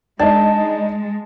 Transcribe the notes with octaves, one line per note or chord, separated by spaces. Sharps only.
G#3 D4 D#4 A5